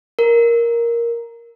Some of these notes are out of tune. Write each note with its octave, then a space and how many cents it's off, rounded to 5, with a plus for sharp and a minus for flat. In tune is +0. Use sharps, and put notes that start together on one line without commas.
A#4 +5